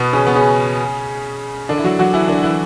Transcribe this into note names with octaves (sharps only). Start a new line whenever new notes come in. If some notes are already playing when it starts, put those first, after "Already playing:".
Already playing: B2 B3
C#3 C#4
B3
C#3 C#4
D3 D4
E4
F#3 F#4
F#3 F#4
E3 E4
D3 D4
E3 E4